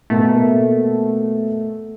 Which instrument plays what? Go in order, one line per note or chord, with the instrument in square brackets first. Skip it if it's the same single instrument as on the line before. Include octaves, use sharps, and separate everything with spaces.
[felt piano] B2 A#3 [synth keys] A3